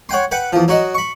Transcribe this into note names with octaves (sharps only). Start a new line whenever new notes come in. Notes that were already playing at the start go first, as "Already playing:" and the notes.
C#5 F#5 G5 C6
B4 F#5 G5
E2 F3
F#3 F#4 D#5
B5 C#6